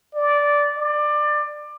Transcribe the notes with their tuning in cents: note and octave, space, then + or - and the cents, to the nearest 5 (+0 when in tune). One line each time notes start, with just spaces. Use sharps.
D5 -10
D5 +20